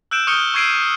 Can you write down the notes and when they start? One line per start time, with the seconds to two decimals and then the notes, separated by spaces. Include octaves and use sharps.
0.11 E6 F#6 G6 D7 E7
0.27 C#6 D#6 F6 G6 C#7 G7
0.54 C#6 E6 G#6 C7 D7 D#7